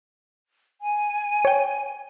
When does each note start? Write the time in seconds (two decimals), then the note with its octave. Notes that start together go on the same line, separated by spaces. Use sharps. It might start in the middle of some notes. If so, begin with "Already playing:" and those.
0.81 G#5
1.45 C#5 G5